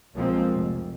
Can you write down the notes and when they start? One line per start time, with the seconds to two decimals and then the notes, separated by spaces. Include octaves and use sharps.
0.14 B1 F3 G#3 A#3 C4
0.52 F1